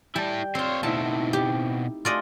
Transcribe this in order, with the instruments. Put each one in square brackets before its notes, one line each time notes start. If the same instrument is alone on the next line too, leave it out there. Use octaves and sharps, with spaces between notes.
[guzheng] G3 [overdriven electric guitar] E4 A5 [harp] G5
[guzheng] C4 F4 [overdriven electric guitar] C5 C#5
[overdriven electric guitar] B2 C4 [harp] A3 D#4 E4 [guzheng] A5
[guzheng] G4
[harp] A3 F#4 G#4 [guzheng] F4 D5 D#5